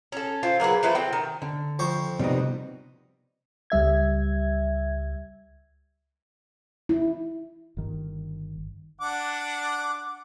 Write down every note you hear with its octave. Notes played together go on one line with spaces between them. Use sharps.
C#4 A4
C4 F4
F#3 A#3 G#4 B4
E3 F3 A3 B4
C4 G5
D#3
D3
F2 C5 C#6
C3 G3 B3 D#4 F#4
C#2 G3 E5 G#6
E4
G1 D#3
D4 F#5 D6